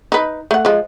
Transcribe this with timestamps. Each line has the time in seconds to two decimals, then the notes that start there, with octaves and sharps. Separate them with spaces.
0.12 D#4 B4
0.51 A3 F#5
0.65 F3 G#3